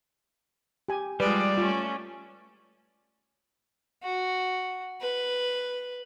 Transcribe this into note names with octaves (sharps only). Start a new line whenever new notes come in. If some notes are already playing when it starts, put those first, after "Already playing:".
G4 G#5
F3 G3 G#3 B4 D5
A3 C#4 F4
F#4
B4